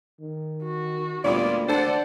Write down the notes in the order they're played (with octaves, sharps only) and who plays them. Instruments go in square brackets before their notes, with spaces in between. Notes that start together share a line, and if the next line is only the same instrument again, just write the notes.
[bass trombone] D#3
[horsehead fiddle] F#4
[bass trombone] D2 [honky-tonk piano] A#2 G3 B3 [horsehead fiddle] A#3 F4 [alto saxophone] D5
[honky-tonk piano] D3 A4 [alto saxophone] C5 [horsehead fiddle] D5 F#5